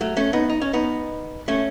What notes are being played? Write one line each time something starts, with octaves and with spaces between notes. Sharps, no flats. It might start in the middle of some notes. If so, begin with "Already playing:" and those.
F#3 A3
A3 C#4
B3 D#4
D#4
C#4
B3 D#4
A3 C#4